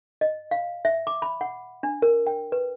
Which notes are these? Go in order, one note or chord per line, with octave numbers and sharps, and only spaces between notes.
D#5
F5
E5
D6
B5
F#5
D4
A#4
G5
B4